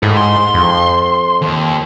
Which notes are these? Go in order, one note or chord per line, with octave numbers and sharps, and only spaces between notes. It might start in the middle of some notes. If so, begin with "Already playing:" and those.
G#2 E4 A4
C6
F2
D#2